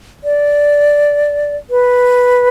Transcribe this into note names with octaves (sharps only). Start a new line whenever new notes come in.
D5
B4